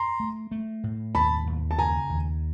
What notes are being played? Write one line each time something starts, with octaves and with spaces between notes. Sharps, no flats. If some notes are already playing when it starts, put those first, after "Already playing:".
Already playing: A#5 C6
A3
A3
A2
D#2 A5 B5
D#2
A5
C#3 G#5 A#5
D#2